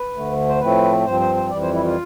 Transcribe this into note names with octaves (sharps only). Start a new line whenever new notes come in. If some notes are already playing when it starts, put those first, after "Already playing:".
Already playing: B4
D2 D3 A3
C5
A2 F3 A3 C4 B4
G2 F3 C4 C5
C5
C5
F2 E3 G3 D5
C5
E4
F4